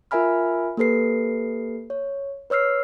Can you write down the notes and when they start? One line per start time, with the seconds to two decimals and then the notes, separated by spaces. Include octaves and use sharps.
0.11 F4 A#4 E5 G#5 B5 F6
0.77 A#3 G4 A4 B4 C7
1.90 C#5
2.50 B4 C#5 E6 F6 C7